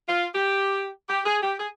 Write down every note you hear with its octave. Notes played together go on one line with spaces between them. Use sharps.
F4
G4
G4
G#4
G4
G#4